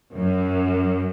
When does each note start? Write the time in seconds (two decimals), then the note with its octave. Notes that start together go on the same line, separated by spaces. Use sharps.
0.14 F#2